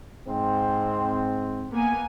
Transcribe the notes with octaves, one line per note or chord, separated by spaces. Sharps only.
G#2 C4
A#3 B3 G#5